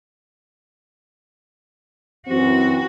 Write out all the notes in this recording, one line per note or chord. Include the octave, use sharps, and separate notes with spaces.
F#2 E3 C4 F#4